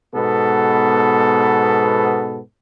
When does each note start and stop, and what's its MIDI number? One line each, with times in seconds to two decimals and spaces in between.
0.15 2.39 44
0.15 2.39 47
0.15 2.39 59
0.15 2.39 69